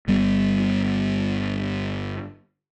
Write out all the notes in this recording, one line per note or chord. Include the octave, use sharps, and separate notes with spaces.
G1 G3 B3